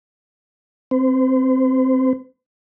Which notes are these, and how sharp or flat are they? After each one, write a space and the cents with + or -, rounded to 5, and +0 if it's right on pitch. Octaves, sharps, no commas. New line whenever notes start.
C4 +0 C5 -35